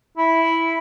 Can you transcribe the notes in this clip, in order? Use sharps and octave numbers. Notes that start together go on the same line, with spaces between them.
E4